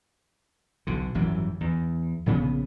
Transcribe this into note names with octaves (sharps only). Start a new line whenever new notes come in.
B1 D3
G#1 F#2 E3 G3
E2
A#1 C#3 B3